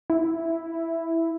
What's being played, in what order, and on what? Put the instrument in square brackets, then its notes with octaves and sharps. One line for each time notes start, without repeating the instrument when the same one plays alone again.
[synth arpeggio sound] E4